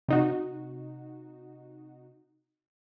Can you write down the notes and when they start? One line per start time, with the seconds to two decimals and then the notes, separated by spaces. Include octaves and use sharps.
0.09 C3 D#4 F#4